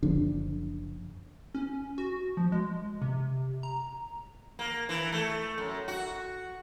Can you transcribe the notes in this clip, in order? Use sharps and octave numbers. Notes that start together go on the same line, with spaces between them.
F#1 D3 F3 D4
C#4
F#4
F3
G#3
C3
A#5
A#3
E3
A3
F#2
F#4